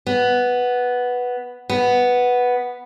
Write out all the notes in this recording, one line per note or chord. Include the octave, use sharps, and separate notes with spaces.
B3
B3